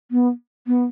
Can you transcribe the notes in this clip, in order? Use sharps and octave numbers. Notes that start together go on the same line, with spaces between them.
B3
B3